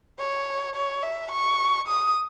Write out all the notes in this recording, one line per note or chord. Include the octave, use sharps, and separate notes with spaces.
C#5
C#5
E5
C#6
D#6